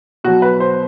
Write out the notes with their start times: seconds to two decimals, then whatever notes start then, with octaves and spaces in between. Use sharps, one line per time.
0.24 B2 F#3 F#4
0.42 B4
0.60 C5